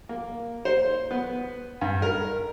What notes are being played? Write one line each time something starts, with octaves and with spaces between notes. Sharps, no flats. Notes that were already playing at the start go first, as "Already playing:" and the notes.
A#3
C5
B3
G2
A#4